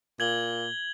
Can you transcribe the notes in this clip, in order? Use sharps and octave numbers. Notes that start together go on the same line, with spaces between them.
A#2 G#6 F#7 G7